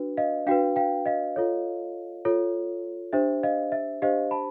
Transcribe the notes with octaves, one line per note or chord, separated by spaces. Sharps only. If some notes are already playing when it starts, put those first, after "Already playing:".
Already playing: D4 F#4 B4
D#5 F5
D4 F#4 B4 F5 G5
F5 G5
D#5 F5
F4 A4 C#5
F4 A4 C#5
D4 G4 C5 E5
D#5 F5
E5
D4 G4 C5 D#5 F5
A5 B5